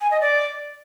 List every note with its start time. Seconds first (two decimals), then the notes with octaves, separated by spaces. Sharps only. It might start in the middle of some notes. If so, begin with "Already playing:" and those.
0.01 G#5
0.11 D#5
0.21 D5